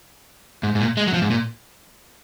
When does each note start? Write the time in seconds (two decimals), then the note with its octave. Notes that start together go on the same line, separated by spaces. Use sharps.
0.63 G#2
0.75 G#2
0.80 A#2
0.97 G#3
1.07 F#3
1.14 F3
1.22 G#2
1.30 A#2